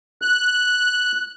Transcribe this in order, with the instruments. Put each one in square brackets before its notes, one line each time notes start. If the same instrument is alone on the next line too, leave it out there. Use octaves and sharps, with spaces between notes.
[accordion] F#6